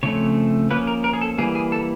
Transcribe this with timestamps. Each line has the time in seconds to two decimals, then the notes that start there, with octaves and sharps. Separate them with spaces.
0.03 C#3 F3 A3 C4 C#5
0.70 F3 A#3 C#4 B4
0.87 A#4
1.04 A#4
1.13 G#4
1.21 A4
1.38 E3 G3 A#3 G#4
1.55 G#4
1.72 A4